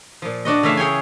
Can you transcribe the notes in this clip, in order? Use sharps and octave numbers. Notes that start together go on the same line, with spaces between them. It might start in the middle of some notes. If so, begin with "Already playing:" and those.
A#2 F3
D4 F#4 D#5
C#3 E3 A3 E5 F5
G#4 C#5 G5 G#5